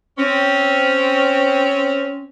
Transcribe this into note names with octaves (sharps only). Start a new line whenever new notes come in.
C4 C#4